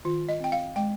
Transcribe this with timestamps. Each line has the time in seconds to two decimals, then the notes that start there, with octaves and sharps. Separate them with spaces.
0.05 D#3 F4
0.29 D#5
0.40 C4 G5
0.52 F5
0.76 G#3 G5